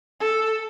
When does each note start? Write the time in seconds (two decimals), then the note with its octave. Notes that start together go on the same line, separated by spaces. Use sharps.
0.20 A4